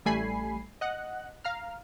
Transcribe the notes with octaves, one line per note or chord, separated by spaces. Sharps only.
A1 G3 A3 G#5 B5 C7
D#5 F#5 F#6
F5 A#5 F6